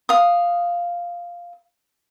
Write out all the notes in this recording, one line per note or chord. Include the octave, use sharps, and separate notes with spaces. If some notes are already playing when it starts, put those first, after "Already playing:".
F5 D#6